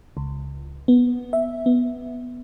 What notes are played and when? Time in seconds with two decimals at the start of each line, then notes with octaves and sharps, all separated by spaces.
0.17 C#2
0.88 B3
1.33 E5
1.66 B3